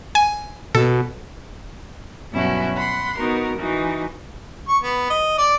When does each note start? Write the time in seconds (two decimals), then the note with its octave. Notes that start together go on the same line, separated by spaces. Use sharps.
0.15 G#5
0.75 B2 A4
2.31 G2 B2 F#3 C#4 E4 F#4
2.76 F#5 B5 C6
3.19 B3 D#4 F#4 A#4
3.58 E3 D#4 F#4
4.68 C#6
4.83 B3
5.10 D#5
5.38 D5